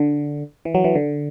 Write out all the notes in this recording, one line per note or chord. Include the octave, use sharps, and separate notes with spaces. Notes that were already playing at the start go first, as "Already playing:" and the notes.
Already playing: D3
E3
F#3
E3
D3